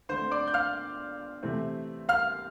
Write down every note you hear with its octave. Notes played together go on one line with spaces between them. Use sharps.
D3 A3 C4 C5 C6
D5 D6
G6
F5 F6
C3 E3 A3 C4
F5 F6